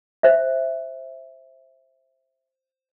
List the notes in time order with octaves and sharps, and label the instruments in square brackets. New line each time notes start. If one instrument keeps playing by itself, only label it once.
[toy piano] C5 E5